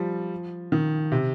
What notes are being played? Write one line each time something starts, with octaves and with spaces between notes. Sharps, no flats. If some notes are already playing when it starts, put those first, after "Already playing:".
Already playing: F3 G3
D#3
C3